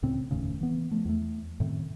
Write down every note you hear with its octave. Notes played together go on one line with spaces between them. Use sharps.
C#2 A2 C#3 C4
F1 D#2 A2 C#3
E3 B3
F3 A3
E2 A3
F#2 A2 C3 D#3